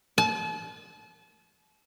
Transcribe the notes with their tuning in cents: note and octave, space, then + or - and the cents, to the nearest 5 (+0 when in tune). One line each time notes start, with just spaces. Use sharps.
A5 -40